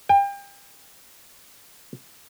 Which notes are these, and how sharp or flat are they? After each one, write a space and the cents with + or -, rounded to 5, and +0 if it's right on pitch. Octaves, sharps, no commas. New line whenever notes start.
G5 +35